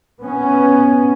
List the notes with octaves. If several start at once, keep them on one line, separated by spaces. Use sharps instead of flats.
B3 C#4